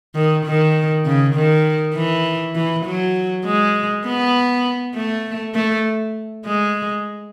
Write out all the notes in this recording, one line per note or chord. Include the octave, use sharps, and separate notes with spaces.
D#3
D#3
C#3
D#3
E3
E3
F#3
G#3
B3
A3
A3
G#3